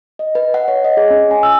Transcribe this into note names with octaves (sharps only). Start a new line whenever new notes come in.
D#5
B4
F#5
C#5
D#5
G#4
C#4
G#5
E6